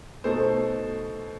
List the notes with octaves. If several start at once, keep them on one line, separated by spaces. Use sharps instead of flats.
B2 A3 D#4 A4 C5